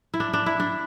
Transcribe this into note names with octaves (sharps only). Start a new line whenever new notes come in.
E4
D4
D4
E4
D4